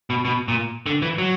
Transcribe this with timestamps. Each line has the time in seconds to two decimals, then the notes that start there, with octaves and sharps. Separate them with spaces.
0.10 B2
0.25 B2
0.48 A#2
0.86 D3
1.02 E3
1.18 F#3